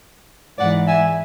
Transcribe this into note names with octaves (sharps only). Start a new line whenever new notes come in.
G#2 E3 D5 F#5
E5 G#5